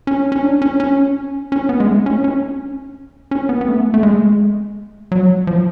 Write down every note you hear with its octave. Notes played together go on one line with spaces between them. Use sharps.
C#4
C#4
D4
C#4
C#4
C#4
B3
G#3
A3
C#4
C#4
C#4
B3
B3
A3
A3
G#3
F#3
F3